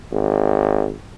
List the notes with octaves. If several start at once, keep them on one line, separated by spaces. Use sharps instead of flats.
G#1